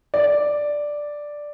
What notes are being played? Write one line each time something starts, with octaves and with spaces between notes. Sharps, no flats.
D5